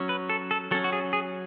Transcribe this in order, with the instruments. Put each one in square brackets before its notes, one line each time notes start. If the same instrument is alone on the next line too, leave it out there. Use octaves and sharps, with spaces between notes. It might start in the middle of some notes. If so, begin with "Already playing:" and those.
Already playing: [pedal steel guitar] F#3 C#4
B4
A4
A4
F#3 C#4 A4
F#4
G#4
G#4